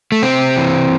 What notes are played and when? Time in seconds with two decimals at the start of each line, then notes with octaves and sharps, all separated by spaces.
0.12 A3
0.23 C3 C4
0.56 E3